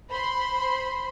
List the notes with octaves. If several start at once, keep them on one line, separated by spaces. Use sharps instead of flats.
C5 B5 C6